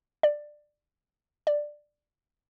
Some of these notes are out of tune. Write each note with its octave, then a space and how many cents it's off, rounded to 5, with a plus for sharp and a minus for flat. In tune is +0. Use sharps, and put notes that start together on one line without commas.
D5 +15
D5 +10